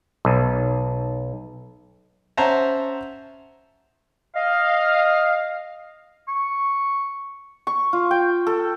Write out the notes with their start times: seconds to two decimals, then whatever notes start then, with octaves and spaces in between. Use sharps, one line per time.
0.25 B1
2.37 C#4 C5 E5 F#5 A5 A#5
4.36 D#5 F5
6.28 C#6
7.67 C#6
7.93 F4
8.11 G5
8.47 A4